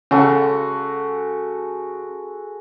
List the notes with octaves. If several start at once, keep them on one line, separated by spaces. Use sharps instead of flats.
C#3 G#3 F#4 A4